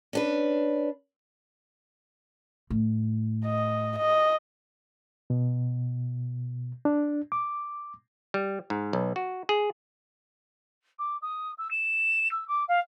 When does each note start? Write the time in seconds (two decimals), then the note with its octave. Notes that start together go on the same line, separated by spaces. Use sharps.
0.13 C#4 D4 B4
2.70 A2
3.46 D#5
3.98 D#5
5.30 B2
6.85 D4
7.32 D6
8.34 G3
8.70 G#2
8.93 B1
9.16 F#4
9.49 G#4
10.99 D6
11.22 D#6
11.58 E6
11.71 E7
12.31 E6
12.48 D6
12.68 F5